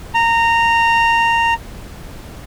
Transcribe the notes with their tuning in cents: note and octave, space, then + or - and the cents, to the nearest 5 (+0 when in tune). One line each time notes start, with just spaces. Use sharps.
A#5 -15